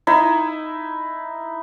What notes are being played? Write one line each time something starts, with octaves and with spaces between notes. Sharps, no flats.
D#4 E4